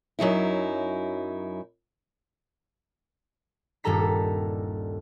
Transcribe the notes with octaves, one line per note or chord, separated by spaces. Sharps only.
F#2 F#3 D#4 E4
D#1 G2 G3 A4 A#5 B6